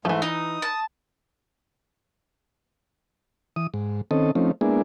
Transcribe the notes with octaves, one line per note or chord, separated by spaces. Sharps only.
G#2 E3 F3 A3
D#4 D#6
A5
E3 D#6
G#2
D#3 C4 C#4 A4 D#5
F3 A3 C4 C#4 D#4
G#3 A#3 B3 D4 E4 G#4